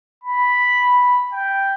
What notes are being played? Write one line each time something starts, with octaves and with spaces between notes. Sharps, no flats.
B5
G5